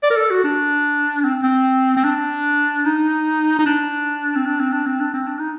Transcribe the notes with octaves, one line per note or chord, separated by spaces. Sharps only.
D5
A#4
A4
F#4
D4
C4
C4
C4
D4
D#4
D#4
D4
C4
D4
C4
D4
C4
D4
C4
D4
D#4